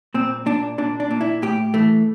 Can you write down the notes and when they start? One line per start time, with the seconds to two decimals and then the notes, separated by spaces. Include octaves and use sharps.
0.14 A#2 C4
0.46 A#2 D4
0.78 A#2 D4
1.00 D4
1.11 A#2
1.21 E4
1.42 A2 G4
1.74 E3 A3